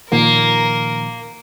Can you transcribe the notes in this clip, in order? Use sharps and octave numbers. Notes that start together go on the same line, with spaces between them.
A#2 D#3 F3 A#3 A#4